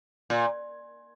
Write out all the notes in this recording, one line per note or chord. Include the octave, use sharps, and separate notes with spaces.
A#2